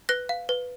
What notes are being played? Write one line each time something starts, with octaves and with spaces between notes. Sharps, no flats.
B4 F#6 A#6
F5
B4